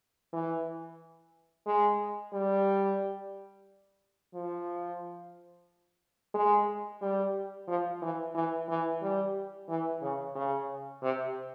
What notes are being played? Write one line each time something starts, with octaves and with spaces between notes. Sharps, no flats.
E3
G#3
G3
F3
G#3
G3
F3
E3
E3
E3
G3
E3
C#3
C#3
C3